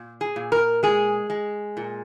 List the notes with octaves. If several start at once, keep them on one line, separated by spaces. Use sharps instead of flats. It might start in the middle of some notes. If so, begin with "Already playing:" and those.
Already playing: A#2
G#4
A#2
A#4
G#3 G#4
G#3
A#2